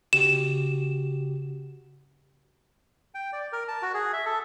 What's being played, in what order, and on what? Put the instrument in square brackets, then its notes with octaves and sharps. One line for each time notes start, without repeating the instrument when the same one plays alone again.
[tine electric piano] C#3 F#4 G4 [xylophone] E7
[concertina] G5
D5
A#4
A5
F#4
G#4
E5
A4